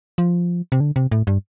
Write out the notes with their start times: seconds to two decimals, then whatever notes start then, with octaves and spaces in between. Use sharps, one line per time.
0.18 F3
0.72 C3
0.80 D3
0.96 C3
1.12 A2
1.27 G2